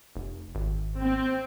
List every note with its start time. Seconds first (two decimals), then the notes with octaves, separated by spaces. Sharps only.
0.16 F1
0.55 G#1
1.00 C4